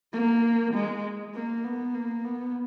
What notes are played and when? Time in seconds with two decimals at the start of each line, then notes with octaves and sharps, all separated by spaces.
0.13 A#3
0.74 G#3
1.34 A#3
1.64 B3
1.94 A#3
2.25 B3